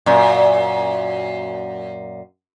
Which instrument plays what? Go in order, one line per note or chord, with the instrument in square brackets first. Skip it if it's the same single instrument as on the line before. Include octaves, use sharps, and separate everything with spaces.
[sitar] F#2 A#2